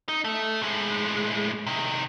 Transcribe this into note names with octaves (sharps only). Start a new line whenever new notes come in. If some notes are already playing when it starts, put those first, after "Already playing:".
D#4
A3
A2 G#3
C3 D#3